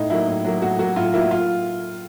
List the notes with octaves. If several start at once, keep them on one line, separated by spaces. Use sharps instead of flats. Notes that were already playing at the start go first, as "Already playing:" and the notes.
Already playing: A2 D#4
F#3 A#3 E4
A2
F#3 A#3
A2 F#4
F#3 A#3 F#4
A2 F4
F#3 A#3 E4
F4